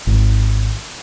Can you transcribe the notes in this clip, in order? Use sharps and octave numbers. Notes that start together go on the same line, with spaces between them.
G#1